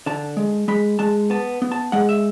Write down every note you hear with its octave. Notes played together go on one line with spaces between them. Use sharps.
D3 A5
G#3
G#3 B5
G#3 A5
B3 A5
B3
A5
G#3 F#5
E5